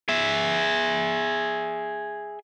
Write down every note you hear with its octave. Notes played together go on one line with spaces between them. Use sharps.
G#4 E5